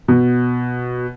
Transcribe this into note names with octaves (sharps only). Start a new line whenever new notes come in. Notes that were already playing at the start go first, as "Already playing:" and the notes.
B2